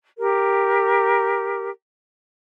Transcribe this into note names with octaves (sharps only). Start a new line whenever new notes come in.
G4 A#4